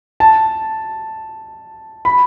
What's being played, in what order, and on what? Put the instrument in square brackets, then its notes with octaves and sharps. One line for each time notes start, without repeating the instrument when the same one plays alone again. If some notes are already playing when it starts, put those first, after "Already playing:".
[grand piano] A5
B5